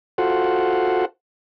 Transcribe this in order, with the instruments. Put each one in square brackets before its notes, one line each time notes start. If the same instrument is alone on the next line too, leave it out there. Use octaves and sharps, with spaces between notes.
[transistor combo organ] F4 F#4 A4 C5 F#5